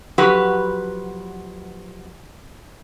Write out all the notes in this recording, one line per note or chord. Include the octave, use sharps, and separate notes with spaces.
F2 F#3 F#4 G4 B4